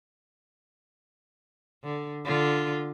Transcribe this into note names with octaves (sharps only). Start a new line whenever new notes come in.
D3
D3 F4